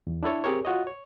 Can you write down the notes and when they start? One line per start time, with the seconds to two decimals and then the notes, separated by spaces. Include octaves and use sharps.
0.07 E2
0.23 D4 E4 A4 C#5
0.44 C4 G4 G#4 A#4 C#5
0.65 F4 F#4 C#5 D#5
0.87 C#5